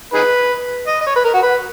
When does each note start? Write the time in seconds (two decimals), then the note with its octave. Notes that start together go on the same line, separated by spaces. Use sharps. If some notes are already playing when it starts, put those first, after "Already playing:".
0.14 D#4 G#4 B4
0.87 D#5
1.01 D#5
1.07 C#5
1.16 B4
1.24 A#4
1.34 F#4
1.43 B4